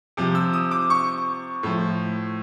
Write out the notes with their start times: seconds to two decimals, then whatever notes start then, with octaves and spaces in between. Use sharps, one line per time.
0.17 C3 F3
0.35 E6
0.53 D#6
0.71 D6
0.90 C#6
1.63 A2 F3